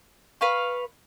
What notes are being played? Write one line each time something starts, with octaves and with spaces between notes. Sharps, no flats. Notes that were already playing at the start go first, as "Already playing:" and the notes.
B4 F5 C#6